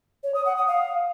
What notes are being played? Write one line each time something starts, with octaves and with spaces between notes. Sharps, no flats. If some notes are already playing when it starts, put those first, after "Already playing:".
C#5
D#6
F#5
D#6
F5